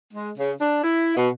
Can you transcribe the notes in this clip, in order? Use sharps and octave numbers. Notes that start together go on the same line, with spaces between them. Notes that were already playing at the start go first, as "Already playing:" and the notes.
G#3
C#3
D4
E4
B2